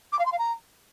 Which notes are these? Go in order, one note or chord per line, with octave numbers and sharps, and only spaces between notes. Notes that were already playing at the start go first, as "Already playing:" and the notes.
D6
F5
C6
F5
A#5